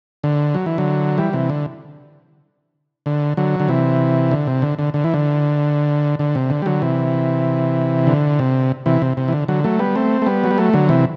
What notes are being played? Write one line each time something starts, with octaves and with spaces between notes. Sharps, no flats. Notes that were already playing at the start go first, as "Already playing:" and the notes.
D3
F#3
E3
D3 F#3
E3 G3
C3 E3
D3
D3
D3 F#3
D3
C3 E3
D3
C3
D3
D3
D3
E3
D3
D3
C3
D3
G3
D3 F#3
C3 E3
D3
C3
C3 E3
C3
C3
E3
D3
D3 F#3
F#3 A3
G3 B3
A3 C4
A3
G3 B3
F#3
G3
F#3 A3
D3 F#3
C3 E3